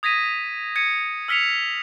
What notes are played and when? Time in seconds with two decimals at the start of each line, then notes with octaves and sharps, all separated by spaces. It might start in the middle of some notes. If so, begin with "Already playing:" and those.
0.03 D#6 G#6 A#6 B6 D#7
0.76 G#6 C#7 D#7
1.28 E6 F6 B6 C#7 F7